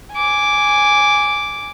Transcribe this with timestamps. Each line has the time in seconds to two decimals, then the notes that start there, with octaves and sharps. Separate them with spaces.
0.13 G#5 D6